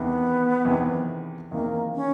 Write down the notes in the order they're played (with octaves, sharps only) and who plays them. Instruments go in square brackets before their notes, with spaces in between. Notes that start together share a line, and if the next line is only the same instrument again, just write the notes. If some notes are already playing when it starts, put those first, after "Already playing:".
Already playing: [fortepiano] E2 C3 D#3 [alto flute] B3
[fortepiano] E2 C3 D#3
[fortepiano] E2 C3 D#3 [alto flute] A#3
[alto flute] C#4